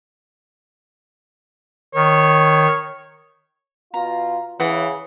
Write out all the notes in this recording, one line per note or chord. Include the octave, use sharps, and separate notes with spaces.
D#3 C#5
B2 F4 A#5
C#3 E3 F#5 D#6